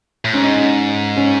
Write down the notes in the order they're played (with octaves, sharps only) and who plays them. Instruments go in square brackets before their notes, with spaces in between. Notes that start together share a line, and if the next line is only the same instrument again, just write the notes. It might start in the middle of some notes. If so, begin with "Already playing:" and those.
[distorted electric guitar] A2
[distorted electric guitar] G#2 [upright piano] C#4
[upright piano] D#4
C#4
C#4